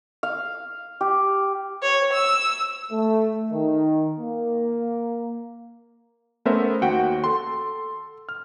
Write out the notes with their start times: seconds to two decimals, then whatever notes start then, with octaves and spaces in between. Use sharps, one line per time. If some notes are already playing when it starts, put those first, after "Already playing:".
0.23 F5
1.01 G4
1.82 C#5
2.13 E6
2.92 A3
3.51 D#3
4.19 A#3
6.45 A3 B3 C#4 A#4 C5 E5
6.82 D#2 F#4 F#5 G5
7.24 A4 C6
8.29 F6